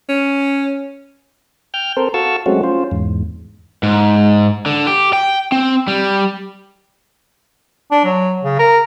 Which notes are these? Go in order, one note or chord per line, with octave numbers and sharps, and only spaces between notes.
C#4
G5 F6 G6
C4 A4 A#4 C5
F#4 A4 F5 A5 C#6 E6
F#3 G#3 A3 C4 C#4 F#4
C#4 F4 C5
E2 G#2
G#2
D3
G4
G5
C4
G3
D4
F#3
C#3
A#4